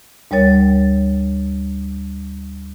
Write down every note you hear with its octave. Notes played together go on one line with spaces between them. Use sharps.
D2 G3 A#4 C#5 A6